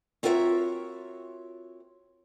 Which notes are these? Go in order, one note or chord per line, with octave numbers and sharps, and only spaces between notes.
C4 F4 F#4 A#4 C#5 E5